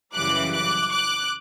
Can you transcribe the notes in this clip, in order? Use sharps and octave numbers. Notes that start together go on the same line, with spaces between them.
F#2 C#3 E3 G3 D6 F#6
D6 F#6
D6 F#6